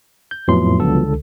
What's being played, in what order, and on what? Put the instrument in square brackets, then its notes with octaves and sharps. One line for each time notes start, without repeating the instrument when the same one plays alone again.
[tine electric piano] G6
[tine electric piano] F2 A2 C6 [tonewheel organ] F3 F#3 B3
[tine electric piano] C#2 D3 A4